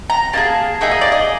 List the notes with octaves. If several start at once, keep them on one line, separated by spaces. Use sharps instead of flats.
A#5
A#3 D#4 G#4 A5
A#3 D#4 G#4 E5
D#5
D5
D#5